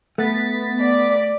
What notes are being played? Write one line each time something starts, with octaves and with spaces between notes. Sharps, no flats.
A3 B3 A6 B6
D5